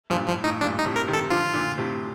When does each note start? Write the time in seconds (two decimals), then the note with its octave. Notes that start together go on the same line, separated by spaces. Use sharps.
0.10 G2 A#2 F3
0.27 A2 F3
0.44 A2 D#4
0.61 G2 A#2 D4
0.79 D#4
0.85 A2 C3
0.96 A#4
1.08 C3 D#3
1.13 A4
1.30 D3 F3 F4
1.53 A#2 D3
1.78 A2 C3